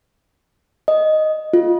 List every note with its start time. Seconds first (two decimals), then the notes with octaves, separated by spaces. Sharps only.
0.88 D#5
1.53 F4